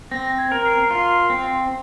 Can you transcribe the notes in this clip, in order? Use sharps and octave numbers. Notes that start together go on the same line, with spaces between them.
C4 A#6
G#6
A#4
C7
F4 C7
C4